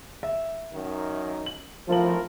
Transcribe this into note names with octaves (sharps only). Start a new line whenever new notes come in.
E5
F#2 D#3
F#7
G#1 A2 F3 F4 A#4 A5 F#7